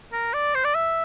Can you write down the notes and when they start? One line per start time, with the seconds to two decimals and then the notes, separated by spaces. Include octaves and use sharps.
0.12 A#4
0.34 D5
0.55 C5
0.64 D5
0.75 E5